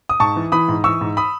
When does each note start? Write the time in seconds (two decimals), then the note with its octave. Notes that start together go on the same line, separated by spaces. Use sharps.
0.09 D#6
0.20 G#2 A5 C#6
0.36 E3
0.52 E3 B5 D#6
0.68 G#2
0.84 E3 C#6 E6
1.01 G#2
1.17 B5 D#6